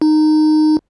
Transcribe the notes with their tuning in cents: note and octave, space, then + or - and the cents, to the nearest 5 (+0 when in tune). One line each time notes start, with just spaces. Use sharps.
D#4 -15